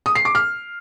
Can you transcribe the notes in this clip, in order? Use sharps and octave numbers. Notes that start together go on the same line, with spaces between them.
D#6
C7
D6
F6